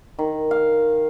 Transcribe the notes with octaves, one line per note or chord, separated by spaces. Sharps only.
D#3
F5